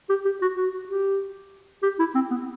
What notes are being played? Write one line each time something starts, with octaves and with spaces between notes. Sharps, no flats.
G4
G4
F#4
F#4
G4
G4
E4
C4
B3